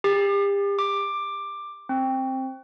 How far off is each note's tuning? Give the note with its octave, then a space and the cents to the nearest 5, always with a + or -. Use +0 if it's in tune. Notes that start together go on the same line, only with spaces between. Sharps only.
G4 +35
D6 +10
C4 +10